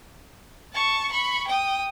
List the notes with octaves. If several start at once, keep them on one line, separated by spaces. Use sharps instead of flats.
A5 C#6
B5 C#6
G5 D#6